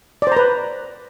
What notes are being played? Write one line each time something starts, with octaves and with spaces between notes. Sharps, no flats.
B4 C5 D5 A#5